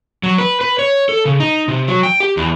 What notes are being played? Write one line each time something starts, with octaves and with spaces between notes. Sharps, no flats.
F#3
B4
B4
C#5
A4
C#3
D#4
C3
F#3
G5
G4
E2